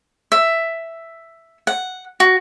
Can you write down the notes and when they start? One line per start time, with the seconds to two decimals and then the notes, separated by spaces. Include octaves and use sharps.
0.32 E5
1.67 F#5
2.20 F#4